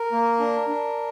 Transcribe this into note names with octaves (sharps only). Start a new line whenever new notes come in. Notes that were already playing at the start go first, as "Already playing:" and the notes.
Already playing: A#4
A#3
D4
D4